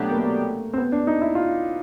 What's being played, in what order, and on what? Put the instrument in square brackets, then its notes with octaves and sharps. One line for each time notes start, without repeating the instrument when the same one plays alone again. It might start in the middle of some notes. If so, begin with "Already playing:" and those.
Already playing: [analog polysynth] B2 F#3 B3 D4 G4 [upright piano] A3
[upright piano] A#3
A3
C4
B3
D4
D#4
E4
F4